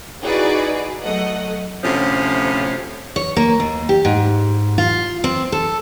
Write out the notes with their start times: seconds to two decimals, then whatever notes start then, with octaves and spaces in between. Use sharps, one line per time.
0.22 D#4 E4 F#4 G#4 B4 D5
1.02 F#3 A3 D#5 F#5
1.84 D2 A2 C3 F3 C#4
3.16 C#5
3.37 A#3
3.60 D#2
3.89 G4
4.05 G#2
4.78 F4
5.24 C4
5.52 A4